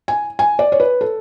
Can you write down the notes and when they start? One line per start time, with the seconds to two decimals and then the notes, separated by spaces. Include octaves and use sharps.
0.08 G#5
0.39 G#5
0.59 D5
0.72 C#5
0.80 B4
1.01 A4